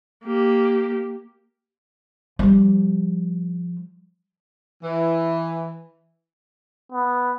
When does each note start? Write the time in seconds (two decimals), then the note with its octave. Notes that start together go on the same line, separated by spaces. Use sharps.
0.25 A#3 G4
2.39 F3 G3
4.83 E3
6.92 B3